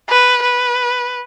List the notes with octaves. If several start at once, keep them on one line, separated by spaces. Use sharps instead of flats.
B4
B4